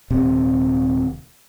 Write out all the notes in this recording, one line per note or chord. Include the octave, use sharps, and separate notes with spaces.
D#1 C3